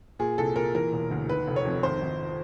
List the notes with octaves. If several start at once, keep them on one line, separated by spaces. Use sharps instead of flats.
A#2 G#4
C2 A4
A#2 A#4
E3 A#4
E1
D2
D#3 B4
F1
C#5
F2
G#1 C5
G#1